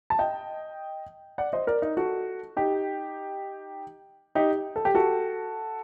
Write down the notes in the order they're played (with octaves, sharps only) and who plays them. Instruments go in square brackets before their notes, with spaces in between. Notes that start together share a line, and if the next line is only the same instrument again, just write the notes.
[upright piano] A5
D#5 G5
D5 F#5
C5 D#5
A#4 D5
D#4
F#4 A4
D#4 G4
D#4 G4
A4
G4
F#4 A4